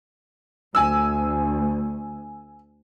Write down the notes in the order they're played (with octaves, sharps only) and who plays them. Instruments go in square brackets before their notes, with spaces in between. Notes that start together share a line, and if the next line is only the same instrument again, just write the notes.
[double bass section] D2 [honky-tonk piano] G#5 E6